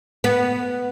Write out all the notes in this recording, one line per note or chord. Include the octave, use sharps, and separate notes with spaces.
B3